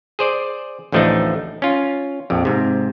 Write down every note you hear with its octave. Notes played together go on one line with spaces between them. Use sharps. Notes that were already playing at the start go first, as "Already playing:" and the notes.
G#4 C5 D5
A1 D2 F3 A3 D4 D#4
C#4 F4
A#1 F2
G#2 C3